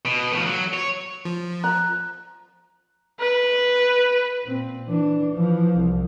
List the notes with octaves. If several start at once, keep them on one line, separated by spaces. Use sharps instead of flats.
B2
A2 F3
F#3
C#5
F3
A#5 F#6
B4
A#2 C4
E3 D4
E3 F3
C2